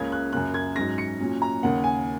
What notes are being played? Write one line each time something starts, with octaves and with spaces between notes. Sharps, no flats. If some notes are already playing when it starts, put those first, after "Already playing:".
Already playing: C#2 C#3 A#3 C#4 G#6
F#6
F#2 C#3 A#3 F#6
G#6
G#2 F#3 C#4 A#6
C#7
A#2 F#3 C#4
A#5
D#2 C#3 A#3 F#5
G#5